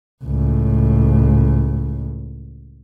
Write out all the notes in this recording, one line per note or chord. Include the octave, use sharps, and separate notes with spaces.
C#2 A2